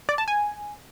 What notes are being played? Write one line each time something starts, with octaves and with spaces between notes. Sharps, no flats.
D5
A5
G#5